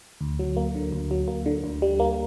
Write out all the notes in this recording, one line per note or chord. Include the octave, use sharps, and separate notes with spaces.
D2
F#3
A#3
D3
D2
F#3
A#3
D3
D2
G3
A#3